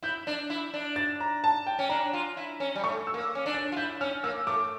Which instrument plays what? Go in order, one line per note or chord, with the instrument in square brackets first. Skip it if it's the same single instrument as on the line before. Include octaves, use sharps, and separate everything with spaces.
[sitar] E4 [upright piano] G6
[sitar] D4
E4
D4
[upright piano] A6
A#5
A5
G5
[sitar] C#4
[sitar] D4 [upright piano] A#5
[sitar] F4
E4
C#4
G3
[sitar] A3 [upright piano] C#6
[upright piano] E6
[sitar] A#3
C#4
D4
[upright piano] A6
[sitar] F4
[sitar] E4 [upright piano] G6
[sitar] C#4 [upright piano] F6
[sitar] A#3 [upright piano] E6
[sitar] A3 [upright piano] D6